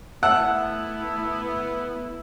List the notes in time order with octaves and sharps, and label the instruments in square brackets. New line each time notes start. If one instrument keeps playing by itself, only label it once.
[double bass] A3 E4 [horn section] B3 [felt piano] E5 A5 E6 [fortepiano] F#5